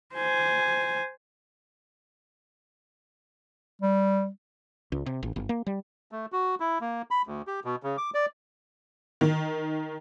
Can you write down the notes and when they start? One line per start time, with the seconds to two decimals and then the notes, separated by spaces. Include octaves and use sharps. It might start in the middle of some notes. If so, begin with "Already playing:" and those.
0.15 C5 G#5
3.82 G3
4.92 C#2
5.06 C3
5.23 A1
5.36 G1
5.49 A#3
5.67 G3
6.12 A3
6.32 F#4
6.60 E4
6.81 A#3
7.11 B5
7.27 D2
7.47 G4
7.64 B2
7.83 C#3
7.98 D6
8.14 D5
9.21 D#3